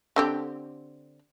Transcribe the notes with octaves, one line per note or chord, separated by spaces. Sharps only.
D3 C4 G4